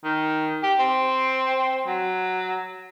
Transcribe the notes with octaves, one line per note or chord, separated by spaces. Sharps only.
D#3
G4
C4
F#3